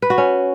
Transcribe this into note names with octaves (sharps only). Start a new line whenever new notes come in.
B4
F#4
C#4